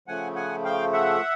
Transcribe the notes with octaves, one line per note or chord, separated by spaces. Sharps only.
C#3 F3 A3 F#5 G#5
F#5 G#5
F5 G5
E5 F#5